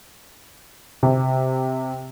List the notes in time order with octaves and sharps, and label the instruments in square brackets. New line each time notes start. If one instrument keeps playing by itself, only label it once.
[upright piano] C3